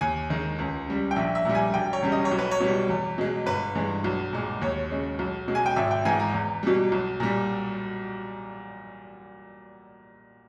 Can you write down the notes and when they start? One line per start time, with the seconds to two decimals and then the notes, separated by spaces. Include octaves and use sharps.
0.01 D#2 G#5
0.30 D#3 G#3
0.59 C#2
0.87 C#3 G3
1.11 G5
1.16 A#1 E5
1.35 E5
1.45 A#2 G3
1.55 G#5
1.74 E1 G5
1.93 C#5
2.02 E2 C#3 G3
2.12 D#5
2.25 C#5
2.31 B1
2.38 B4
2.51 C#5
2.60 B2 G3
2.89 E2
3.18 B2 G#3
3.46 G1 B4
3.75 G2 E3 G#3
4.04 B1
4.33 A#2 G#3
4.61 D#2 C#5
4.91 C#3 G#3
5.19 B1
5.48 B2 G#3
5.55 G#5
5.66 G5
5.76 G#1 E5
5.91 G5
6.05 G#2 E3 G#3 G#5
6.19 A#5
6.34 E2
6.63 B2 G3
6.92 B1
7.20 A#2 G3